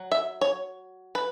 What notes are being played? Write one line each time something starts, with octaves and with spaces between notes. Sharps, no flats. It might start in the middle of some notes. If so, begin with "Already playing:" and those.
Already playing: F#3
E5
C#5
B4